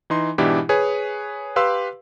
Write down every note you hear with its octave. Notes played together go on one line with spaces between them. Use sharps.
E3 D#4 C6
G#2 B2 E3 D4 E4 G4
G#4 B4 C#5 G#5
G4 B4 F5 C6 E6